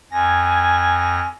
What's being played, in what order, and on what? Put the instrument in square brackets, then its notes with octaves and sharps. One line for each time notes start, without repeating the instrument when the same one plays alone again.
[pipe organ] F2 A#6 [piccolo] G#5